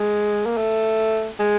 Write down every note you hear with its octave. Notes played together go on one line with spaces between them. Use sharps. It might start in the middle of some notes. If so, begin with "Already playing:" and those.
Already playing: G#3
A#3
A3
G#3